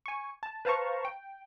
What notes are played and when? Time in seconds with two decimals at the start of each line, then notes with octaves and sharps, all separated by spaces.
0.06 G#5 C#6
0.43 A5
0.65 B4 C5 F5 A5 A#5 C#6
1.05 G5